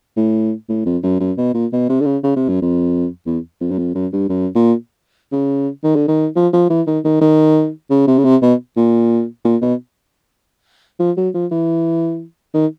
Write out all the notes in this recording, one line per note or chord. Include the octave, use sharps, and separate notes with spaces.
A2
A2
F2
F#2
F#2
B2
A#2
B2
C3
D3
C#3
C#3
C3
F#2
F2
E2
F2
F#2
F2
F#2
G2
F#2
A#2
C#3
D#3
D3
D#3
F3
F3
E3
D#3
D#3
D#3
C#3
C3
C#3
C3
B2
A#2
A#2
B2
F3
F#3
F3
E3
D#3